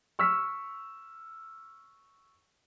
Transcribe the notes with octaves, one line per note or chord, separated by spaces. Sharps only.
C#6 E6 F6 B6